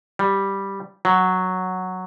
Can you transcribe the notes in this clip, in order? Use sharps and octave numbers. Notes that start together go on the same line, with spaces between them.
G3
F#3